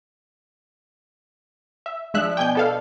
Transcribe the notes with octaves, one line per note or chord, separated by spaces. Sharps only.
E5
F3 G#3 D4 E5 F#6
B2 G5 G#5 D6 G6
B3 A4 F5